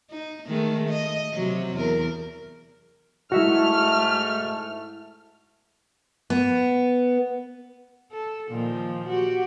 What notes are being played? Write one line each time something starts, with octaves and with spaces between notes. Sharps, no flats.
D#4
D#3 G#3 A3
D#5
C3 F#3
E2 A#4
G#2 G#3 A3 E4 F#4 E5 F6 C#7
B3
A4
A#2 D#3 F3
F#4 G4